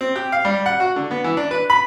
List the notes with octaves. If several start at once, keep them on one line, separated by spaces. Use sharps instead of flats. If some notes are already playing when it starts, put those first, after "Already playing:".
C4
G4
F5
G3
F#5
F#4
D3
B3
E3
D4
B4
B5